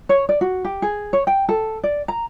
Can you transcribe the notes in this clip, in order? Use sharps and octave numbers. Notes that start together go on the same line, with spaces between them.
C#5
D5
F#4
G4
G#4
C#5
G5
A4
D5
A#5